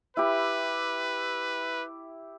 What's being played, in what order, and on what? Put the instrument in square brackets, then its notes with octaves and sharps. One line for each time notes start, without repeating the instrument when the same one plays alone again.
[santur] E4 G4 [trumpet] B4